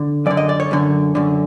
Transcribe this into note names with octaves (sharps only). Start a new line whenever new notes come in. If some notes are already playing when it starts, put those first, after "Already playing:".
Already playing: D3
F#2 D3 D5
D#5
D5
C#5
F#2 D3
F#2 D3